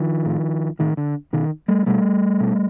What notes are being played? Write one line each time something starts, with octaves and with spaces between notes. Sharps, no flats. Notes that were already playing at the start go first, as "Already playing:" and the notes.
Already playing: D#3 F3
A2
A2 D#3
D3
B2 D#3
G3 A3
B2 G3 A3
B2